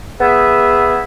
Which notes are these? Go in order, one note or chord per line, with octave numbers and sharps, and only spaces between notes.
B3 G#4 E5